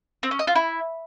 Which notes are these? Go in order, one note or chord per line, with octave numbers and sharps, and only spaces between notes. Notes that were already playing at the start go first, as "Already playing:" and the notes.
C4
C#4
D#5
F4
E4